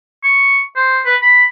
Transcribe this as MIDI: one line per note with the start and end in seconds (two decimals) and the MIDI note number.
0.23 0.62 85
0.76 1.00 72
1.05 1.15 71
1.22 1.44 83